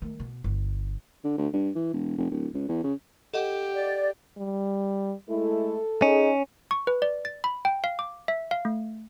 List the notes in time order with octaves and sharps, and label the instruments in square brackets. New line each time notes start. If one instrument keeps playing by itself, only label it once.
[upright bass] D#3 A3
B2
G1
[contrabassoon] D3
D2
G2
E3
E1
F1
D1
C#2
E2
C#3
[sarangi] G4 [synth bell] A4 D#5 F#5
[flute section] D5
[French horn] G3
[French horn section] G#3 A3 E4 [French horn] A4
[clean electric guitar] C#4 [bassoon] D#4 [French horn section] G#4
[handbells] C#6
B4
D5
A6
B5
G5
F5
D6
E5
F5
A3